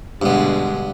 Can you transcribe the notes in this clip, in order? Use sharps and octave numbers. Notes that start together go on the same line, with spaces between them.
G2 B2 D3 G#3 B3